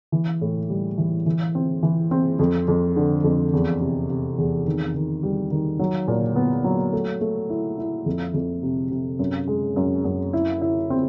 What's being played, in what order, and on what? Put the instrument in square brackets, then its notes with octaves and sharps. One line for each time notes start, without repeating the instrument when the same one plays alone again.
[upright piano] E3
A2
G3
E3
E3
C4
E3
C4
F2
F2
D3
F2
E2
C3
C3
E2
D#3
D#3
G3
D#3
F#3
A#2
B3
F#3
A3
A3
E4
E4
F2
F2
C3
C3
F#2
G#3
F#2
F#2
E4
E4
C4